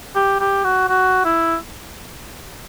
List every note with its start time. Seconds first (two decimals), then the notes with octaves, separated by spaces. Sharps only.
0.15 G4
0.40 G4
0.64 F#4
0.88 F#4
1.25 E4